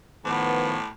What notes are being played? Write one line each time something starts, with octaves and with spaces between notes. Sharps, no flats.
A2 D#3 F3 B3